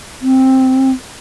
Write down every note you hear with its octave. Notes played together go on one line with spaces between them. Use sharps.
C4